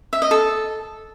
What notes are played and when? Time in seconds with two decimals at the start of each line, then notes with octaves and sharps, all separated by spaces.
0.13 E5
0.22 D#5
0.31 A4